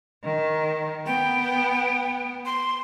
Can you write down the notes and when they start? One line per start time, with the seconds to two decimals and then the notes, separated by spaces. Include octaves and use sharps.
0.24 D#3
1.06 B3 G5
2.46 C6